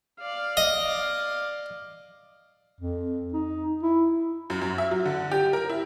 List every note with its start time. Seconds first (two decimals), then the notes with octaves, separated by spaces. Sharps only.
0.20 D5 F5
0.57 D#5
2.81 F2
3.33 D#4
3.83 E4
4.50 F#2
4.61 F#2
4.78 E5
4.91 F#3
5.06 D3
5.31 G4
5.53 A#4
5.69 E4